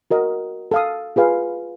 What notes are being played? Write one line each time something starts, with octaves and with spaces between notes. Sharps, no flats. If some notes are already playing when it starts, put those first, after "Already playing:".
F#4 A#4 D#5
A4 F5 D#6
F4 G#4 B4 F5